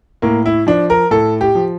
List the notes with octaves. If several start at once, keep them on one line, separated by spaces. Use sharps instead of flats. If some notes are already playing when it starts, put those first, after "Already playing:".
A2 A#3
E4
F3 D4
A#4
A2 A4
G4
F3